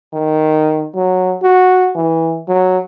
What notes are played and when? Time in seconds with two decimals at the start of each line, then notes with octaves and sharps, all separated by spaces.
0.13 D#3
0.95 F#3
1.42 F#4
1.95 E3
2.48 F#3